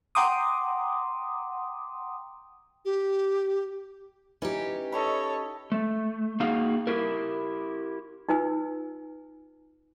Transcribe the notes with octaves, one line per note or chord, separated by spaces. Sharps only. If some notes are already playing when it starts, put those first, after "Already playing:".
F#5 G5 A#5 C6 D6 D#6
G4
E3 C#4 D#4 G4
A4 C#5 D#5 A5 B5
A3
A#3 D#4 F#4 G#4 F5
E4 G4 A#4
D#4 F4 B4 G#5 E6